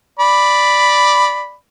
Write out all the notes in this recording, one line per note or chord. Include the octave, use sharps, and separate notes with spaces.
D5 B5